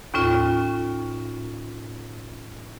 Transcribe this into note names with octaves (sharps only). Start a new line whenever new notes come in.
D#2 A2 C#4 F4